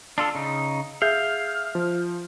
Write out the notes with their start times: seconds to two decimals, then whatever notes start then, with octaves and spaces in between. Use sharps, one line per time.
0.18 D4 F4 A4
0.35 C#3 D#4
1.02 G#4 E5 F5 G6
1.75 F3